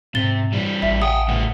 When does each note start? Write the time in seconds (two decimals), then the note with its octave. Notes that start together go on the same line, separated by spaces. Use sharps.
0.15 G#2 C3 A6 G7
0.53 E3 G3
0.82 A1 E5
1.02 F#5 G5 D#6
1.29 A2 B3 F#5